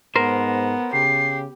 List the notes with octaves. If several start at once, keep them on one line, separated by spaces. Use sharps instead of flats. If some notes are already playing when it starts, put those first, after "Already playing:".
G#2 B3 A#4 C5
C#3 G4 C7